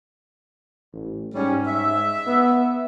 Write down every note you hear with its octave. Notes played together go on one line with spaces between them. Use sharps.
A1
G#2 G3 C#4
E5
B3